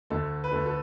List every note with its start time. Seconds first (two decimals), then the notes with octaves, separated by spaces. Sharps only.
0.10 D2 D3 A3 A4
0.44 B4
0.52 D2 D3 A3 A4
0.66 A4